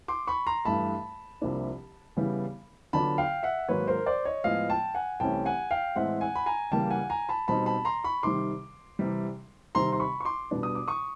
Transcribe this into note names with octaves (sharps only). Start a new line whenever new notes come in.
C6 D6
B5 C#6
A#5 C6
G2 E3 A3 A5 B5
C2 C3 F3 A#3 D4
C#3 E3 G3 B3 E4
D3 F#3 B3 D4 F4 A5 B5
F5 G5
E5 F#5
G#2 D#3 F#3 A#3 B4 C#5
A#4 C5
C5 D5
C#5 D#5
A2 F3 G#3 B3 D#5 F5
G5 A5
F#5 G#5
C2 C3 E3 A3 C#4 G5 A5
F#5 G#5
F5 G5
A2 E3 G#3 C4 E5 F#5
F#5 G#5
B5
G#5 A#5
C#3 E3 G3 A#3 G5 A5
F#5 G#5
G#5 A#5
A5 B5
B2 G3 C4 D#4 A5 B5
A5 B5
A#5 C6
B5 C#6
C3 D#3 G3 C6 D6
C3 E3 G3
C3 D#3 G3 C4 A#5 C6
C6
B5 C#6
C#6
C6 D6
B2 G3 B3 D4
D#6
D6
C#6 D#6